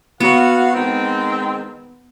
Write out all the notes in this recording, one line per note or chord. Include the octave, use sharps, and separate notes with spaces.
B3 F#4 F5
D#3 G#3 C4